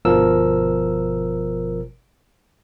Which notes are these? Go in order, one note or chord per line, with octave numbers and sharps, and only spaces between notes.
G1 B2 F3 A#4 E6